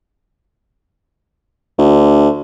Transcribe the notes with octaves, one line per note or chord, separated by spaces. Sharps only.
D2